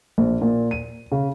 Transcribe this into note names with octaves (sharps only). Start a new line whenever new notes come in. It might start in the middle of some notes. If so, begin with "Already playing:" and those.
A#1
A#2
D#7
C#3